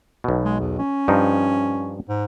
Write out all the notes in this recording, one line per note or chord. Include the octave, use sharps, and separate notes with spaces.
B1 B2
G#3
E2
C#4
G2 F3 D#4
G#2